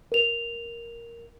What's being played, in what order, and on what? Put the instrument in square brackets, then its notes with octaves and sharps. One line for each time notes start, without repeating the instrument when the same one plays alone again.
[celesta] A#4 F7